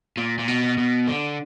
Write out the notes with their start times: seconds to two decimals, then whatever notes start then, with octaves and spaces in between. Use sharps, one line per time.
0.17 A#2
0.39 A#2
0.48 B2
0.78 B2
1.07 D3